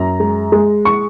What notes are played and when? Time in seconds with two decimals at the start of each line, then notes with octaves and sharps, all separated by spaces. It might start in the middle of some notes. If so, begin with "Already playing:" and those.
Already playing: F#2 A#5
0.20 G#3
0.52 G#3
0.85 C#6